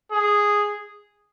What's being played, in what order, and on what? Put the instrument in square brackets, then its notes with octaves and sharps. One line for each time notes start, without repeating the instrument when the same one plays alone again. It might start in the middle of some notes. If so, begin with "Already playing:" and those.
[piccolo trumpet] G#4